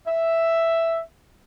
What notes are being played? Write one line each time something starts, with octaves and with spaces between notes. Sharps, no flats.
E5